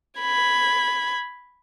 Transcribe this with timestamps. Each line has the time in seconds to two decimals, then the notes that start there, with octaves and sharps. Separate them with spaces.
0.20 B5 G#6